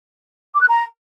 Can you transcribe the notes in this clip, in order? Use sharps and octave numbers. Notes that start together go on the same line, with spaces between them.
D6
F#6
A#5